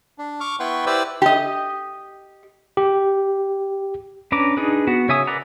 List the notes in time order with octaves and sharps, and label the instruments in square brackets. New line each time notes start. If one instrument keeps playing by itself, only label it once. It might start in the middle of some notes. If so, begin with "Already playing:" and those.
[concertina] D4
C#6 D6 F6
B3 E4 B4 G5 C6 C#6
E4 G4 B4 C5 D5 E6
[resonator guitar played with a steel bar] G4 D#5
[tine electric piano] G4
[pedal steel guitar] C#4 D4 B4 A#5 D6
D4 D#4 G#4 B4
B3 F#4
C#3 C#5 E5 G#5 D#6
A#4 B4 D5 F#5 A#5